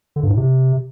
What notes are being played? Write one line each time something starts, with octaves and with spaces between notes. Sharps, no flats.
D3
G2
A2
C3